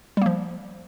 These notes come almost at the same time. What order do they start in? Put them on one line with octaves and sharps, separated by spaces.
G3 A#3 F3